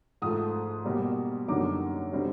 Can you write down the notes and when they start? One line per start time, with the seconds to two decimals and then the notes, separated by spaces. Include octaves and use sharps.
0.22 G#2 F3 A3 D#6
0.85 B2 G3 A#3
1.48 F#2 D3 G3 A#3 D#4 D6
2.12 D3 G3 C4